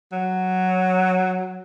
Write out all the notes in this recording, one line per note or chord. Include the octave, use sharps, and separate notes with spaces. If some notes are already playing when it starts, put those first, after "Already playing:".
F#3